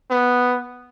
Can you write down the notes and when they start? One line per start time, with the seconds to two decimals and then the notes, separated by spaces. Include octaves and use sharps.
0.10 B3